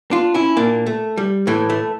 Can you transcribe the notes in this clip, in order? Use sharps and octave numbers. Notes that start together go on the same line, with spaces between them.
D4 F4
C#4 E4
A#2 A#3 D4
A3
G3
A2 E3 A3
A3